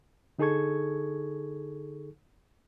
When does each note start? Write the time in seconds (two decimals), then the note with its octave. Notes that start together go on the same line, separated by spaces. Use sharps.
0.39 D3 D#4 G#4 A4 C#6 G#6